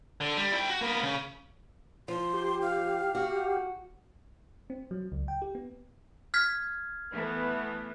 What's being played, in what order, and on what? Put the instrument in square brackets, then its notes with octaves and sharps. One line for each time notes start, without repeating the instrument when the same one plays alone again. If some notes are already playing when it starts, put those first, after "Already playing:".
[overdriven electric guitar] D3
G3
E4 G5
F#4
A#3 B3
C#3
[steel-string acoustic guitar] F3 [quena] C6
[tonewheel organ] G4
[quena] F5
[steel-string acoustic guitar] F#4
[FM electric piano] C4
F#3
C#2
G5
G4
B3
[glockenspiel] F6 G#6 B6
[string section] E3 A3 B3